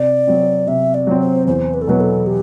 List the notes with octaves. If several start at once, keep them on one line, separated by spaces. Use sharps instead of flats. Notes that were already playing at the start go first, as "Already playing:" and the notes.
Already playing: C3 D5
F#3 C4
C3 E5
D5
F#3 C4
C5
E2 C5
B4
A4
B2 F#3 B3 B4
A4
G4